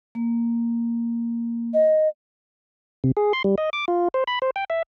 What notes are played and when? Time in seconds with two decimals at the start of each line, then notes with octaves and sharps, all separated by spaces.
0.15 A#3
1.74 D#5
3.04 C3
3.17 G#4
3.33 C6
3.44 G3
3.58 D#5
3.73 D6
3.88 F4
4.14 C5
4.27 B5
4.42 C5
4.56 G5
4.70 E5